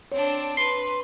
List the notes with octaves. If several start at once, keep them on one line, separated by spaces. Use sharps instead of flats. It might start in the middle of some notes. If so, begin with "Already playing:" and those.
C4 D4 C#5
B4 C6